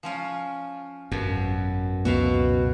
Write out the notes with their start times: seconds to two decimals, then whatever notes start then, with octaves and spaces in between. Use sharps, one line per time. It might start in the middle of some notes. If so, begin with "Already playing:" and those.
0.03 F3 C#4 F4
1.12 G#1 F#2 B2
2.05 G1 C#2 B2 F#4 E5 F5